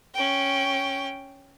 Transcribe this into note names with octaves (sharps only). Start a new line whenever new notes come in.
C#4 G5